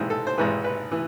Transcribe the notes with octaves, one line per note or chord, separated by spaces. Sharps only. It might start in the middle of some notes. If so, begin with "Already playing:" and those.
Already playing: G#1 G#2 E3 C4
A4
C5
G#1 G#2 E3 B4
B4
E3